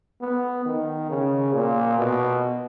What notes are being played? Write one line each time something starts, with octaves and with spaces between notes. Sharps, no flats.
B3
D#3
C#3
A#2
B2